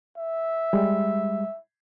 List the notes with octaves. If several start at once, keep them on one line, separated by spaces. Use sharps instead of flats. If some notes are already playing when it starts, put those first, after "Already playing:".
E5
G3 G#3